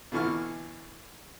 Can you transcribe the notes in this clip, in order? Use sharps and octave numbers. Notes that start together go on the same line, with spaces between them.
B2 D3 E3 C#6 F6